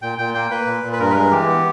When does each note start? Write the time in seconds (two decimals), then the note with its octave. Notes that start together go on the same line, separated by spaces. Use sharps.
0.02 A#2 G5
0.18 A#2 G5
0.34 A#3 G5
0.51 A#3 B4
0.67 A#2
0.83 A#2
0.93 B4
1.00 G2 A#4
1.11 B4
1.15 G#3 A#4
1.31 E3 G4
1.48 B3